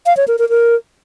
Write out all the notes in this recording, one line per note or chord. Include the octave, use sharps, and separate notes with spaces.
F5
C#5
A#4
A#4
A#4